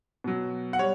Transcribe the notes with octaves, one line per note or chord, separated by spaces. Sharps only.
B2 F#3
F#5
G3 C#5